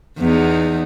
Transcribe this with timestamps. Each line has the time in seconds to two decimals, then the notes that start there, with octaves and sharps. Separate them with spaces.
0.19 E2 B3 D#4